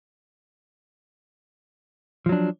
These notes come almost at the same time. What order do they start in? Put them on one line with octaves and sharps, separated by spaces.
F3 F#3 D4